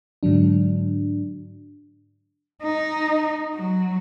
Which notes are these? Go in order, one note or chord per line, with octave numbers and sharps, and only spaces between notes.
G#2 D3 F#3 D4
D#4
F#3